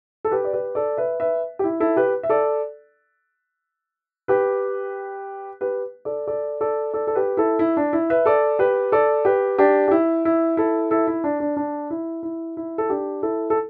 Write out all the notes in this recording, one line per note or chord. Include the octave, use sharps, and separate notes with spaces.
A4
G4 B4
D5
G4 B4
A4 D5
B4 E5
B4 E5
G4
E4
E4 A4
G4 B4
E5
A4 D5
G4 B4
G4 B4
A4 D5
A4 D5
A4 D5
A4 D5
A4
G4 B4
E4 A4
E4
D4
E4
B4 E5
A4 D5
G4 B4
A4 D5
G4 B4
D4 G4
G4
E4
E4
E4 A4
E4 A4
E4
D4
D4
D4
E4
E4
E4
A4
D4 G4
E4 A4
A4